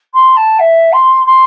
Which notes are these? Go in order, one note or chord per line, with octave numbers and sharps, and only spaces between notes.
C6
A5
E5
C6
C6